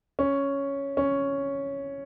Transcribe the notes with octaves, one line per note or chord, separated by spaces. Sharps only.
C#4
C#4